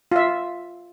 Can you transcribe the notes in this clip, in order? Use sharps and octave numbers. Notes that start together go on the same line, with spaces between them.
F4 E5